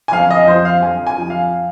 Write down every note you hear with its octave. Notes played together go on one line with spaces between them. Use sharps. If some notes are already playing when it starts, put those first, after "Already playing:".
G#5
F2 F5
D#5
F3 C5
F5
F2 G#5
G#5
F3
F5